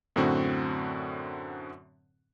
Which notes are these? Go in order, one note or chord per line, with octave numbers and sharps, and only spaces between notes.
F#2 A2 D3 C4 F#4